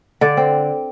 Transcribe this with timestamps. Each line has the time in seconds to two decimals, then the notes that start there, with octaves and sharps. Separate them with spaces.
0.21 D3 D5
0.37 C4